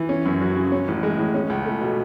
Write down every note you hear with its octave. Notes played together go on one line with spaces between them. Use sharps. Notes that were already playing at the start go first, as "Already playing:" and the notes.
Already playing: E3
C#4
F#2
F#3
C#3
C#4
A1
G#3
A2
C#4
C#2
A3
B2